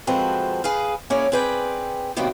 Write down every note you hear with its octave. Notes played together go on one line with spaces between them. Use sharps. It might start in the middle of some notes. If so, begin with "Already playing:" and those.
F3 G#3 C4 F#4 A4 B4
G#4 B4 F5
A#3 C#4 E4 G#4 C#5 D5
C4 G#4 B4 D5 G5
F#2 C3 D#3 G3 A#3 B3